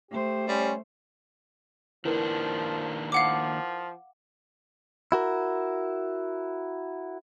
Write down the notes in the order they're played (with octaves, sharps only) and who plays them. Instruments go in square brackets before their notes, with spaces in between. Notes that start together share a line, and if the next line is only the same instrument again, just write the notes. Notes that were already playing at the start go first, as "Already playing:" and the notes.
[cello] A3 C5 [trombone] G4
[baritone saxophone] G3 [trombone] C#4
[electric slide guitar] D#3 A#3 D4 [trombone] F3 [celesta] E4 A#4 B4
[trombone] F3 [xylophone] F5 F#5 D6
[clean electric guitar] E4 F#4 A#4